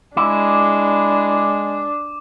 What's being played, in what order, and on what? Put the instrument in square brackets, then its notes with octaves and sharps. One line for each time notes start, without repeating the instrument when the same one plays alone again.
[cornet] G#3 [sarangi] D4 [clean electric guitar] E4 [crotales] D6